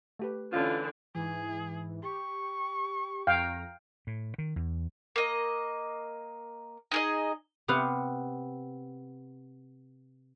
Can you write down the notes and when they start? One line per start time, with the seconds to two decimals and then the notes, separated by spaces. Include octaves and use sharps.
0.19 A3 G4 B4
0.52 D3 E3 C#4 F4 A5
1.15 G#2 E3 G#4
2.03 G4 C#6
3.27 F2 F5 G5 A#5
4.07 A2
4.38 D#3
4.56 E2
5.16 A#3 D#5
6.91 D#4 G#4 D#5
7.68 C3 B3 F5 F#5